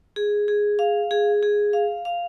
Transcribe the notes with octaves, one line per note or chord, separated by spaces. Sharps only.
G#4
G#4
F5
G#4
G#4
F5
F5